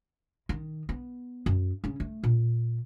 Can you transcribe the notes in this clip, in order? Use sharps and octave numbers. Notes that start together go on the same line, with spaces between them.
D#3
B3
F#2
C#3 C#4
A3
A#2